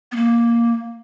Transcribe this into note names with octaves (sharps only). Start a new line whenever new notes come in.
B3
A#3